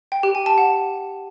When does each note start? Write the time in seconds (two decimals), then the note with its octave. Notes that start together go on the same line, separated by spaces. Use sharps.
0.12 G5
0.23 G4
0.35 G#5
0.46 A5
0.58 F#5